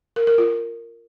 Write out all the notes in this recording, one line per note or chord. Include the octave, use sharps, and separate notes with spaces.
A#4
A#4
F4